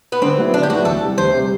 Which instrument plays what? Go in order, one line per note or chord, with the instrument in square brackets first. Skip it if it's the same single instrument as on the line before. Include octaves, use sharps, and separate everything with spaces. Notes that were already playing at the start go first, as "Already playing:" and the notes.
[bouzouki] B3
[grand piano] D3 [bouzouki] C4
[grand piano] F#3 B3 E4
[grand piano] D3 [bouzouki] D4
[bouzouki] G4
[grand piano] F#3 B3 E4 [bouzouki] F#4
[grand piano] D2 [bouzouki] A4
[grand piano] C3 G3
[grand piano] D2 [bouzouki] C5
[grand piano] C3 G3